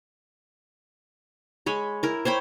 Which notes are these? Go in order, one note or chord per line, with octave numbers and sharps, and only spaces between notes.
G#3 C#5 B5
E4 A#4
C5 C#5 G5 B5